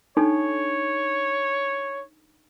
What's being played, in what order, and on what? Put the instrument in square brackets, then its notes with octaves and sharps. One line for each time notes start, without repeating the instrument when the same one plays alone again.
[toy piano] D4 D#4 A4 [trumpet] C#5